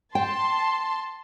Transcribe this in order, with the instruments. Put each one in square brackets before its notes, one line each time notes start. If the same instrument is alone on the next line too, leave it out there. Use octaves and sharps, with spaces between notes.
[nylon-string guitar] G5 [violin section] A5 C6